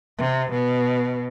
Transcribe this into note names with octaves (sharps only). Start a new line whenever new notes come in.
C3
B2